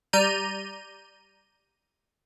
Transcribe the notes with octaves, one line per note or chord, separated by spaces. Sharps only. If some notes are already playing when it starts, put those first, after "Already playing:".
G3 D5 A#5 G6 D#7